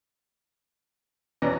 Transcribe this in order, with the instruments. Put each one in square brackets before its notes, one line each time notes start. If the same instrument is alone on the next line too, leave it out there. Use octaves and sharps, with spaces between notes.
[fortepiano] E2 B2 E3 [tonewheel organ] C#4 D5 A#5